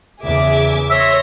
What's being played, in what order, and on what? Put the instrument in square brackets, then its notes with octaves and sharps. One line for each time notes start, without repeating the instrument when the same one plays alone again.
[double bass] E2 C#3 [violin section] G#4 E5 D6
[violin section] C#5 C6 A#6 [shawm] E5